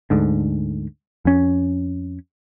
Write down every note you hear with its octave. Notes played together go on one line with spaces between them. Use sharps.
D2 G#2 D3
F2 C#4